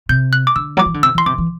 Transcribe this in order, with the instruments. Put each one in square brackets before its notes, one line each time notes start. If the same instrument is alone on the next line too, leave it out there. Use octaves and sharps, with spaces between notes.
[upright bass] C3 [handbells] G6
[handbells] F#6
D6
[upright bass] D3 [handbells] E6
[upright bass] F#3 [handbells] D6
[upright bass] E3
D3
[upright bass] C3 [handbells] E6
[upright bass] E3 [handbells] C6
[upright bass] C3 [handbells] D6
[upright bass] E3